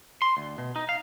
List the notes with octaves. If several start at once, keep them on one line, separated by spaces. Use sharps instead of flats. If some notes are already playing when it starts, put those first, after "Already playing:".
C6
D2
B2
D#4
F5